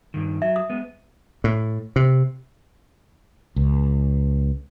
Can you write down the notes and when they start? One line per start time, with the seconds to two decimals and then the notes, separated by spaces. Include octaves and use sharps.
0.14 G2 D#3
0.42 F#3 E5
0.56 D#6
0.70 G#3 B3
1.44 A2
1.96 C3
3.56 C#2